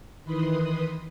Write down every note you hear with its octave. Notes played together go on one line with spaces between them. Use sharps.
D#3 E3 B4 B5 C6 D#6